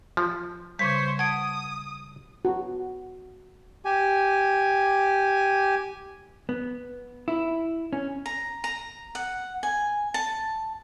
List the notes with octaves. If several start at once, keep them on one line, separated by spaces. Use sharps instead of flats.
F3
C#3 G3 C5 C#5 B6
F#5 A5 D#6 G#6 D7
F#4
G4 G#5
B3
E4
C#4
A#5
A#5
F#5
G#5
A5